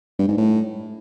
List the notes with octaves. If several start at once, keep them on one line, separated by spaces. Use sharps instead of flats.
G2
G#2
A2